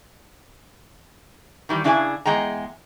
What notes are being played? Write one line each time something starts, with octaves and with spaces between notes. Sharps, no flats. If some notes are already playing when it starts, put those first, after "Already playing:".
D#3 E3 G3
C#3 D4 E4 G#4 C#5 G#5
E2 G#3 G5 A#5